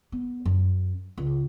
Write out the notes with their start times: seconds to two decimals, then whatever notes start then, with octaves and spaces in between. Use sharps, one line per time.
0.12 B3
0.46 F#2
1.18 C#2